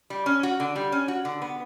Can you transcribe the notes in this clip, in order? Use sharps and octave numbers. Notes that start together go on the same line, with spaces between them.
G3
C#4
F#4
D3
G3
C#4
F#4
D3
B3